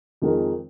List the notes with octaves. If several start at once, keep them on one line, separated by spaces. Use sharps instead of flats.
F2 D#3 G#3 D#4 A#4